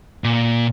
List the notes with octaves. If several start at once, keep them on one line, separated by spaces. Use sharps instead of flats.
A#2